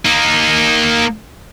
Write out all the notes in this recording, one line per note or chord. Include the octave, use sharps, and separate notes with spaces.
A#3 D#4